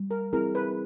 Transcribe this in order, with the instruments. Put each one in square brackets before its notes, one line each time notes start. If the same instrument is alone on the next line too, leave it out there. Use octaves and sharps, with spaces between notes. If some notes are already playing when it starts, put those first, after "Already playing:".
Already playing: [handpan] G3
[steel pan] A#4
[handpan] C4 E4 G#4 [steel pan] A#4
[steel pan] B4